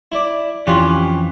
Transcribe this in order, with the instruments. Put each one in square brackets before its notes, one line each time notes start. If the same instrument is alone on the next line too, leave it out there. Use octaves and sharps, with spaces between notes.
[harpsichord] E4 D5
[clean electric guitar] F2 E3 [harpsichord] C#4 F4 G4